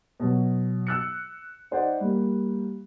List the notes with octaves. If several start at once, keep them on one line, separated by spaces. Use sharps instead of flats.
B2 F#3
E6 F#6 C#7
D#4 C5 D5 F#5
G3 A#3